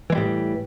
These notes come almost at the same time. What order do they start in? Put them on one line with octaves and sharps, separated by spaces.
E3 G#3 G3 A2